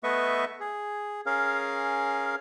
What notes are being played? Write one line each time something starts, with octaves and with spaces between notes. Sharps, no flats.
A3 B3 B4 D#5 E5 C#6
G#4
C#4 G#4 A#4 F5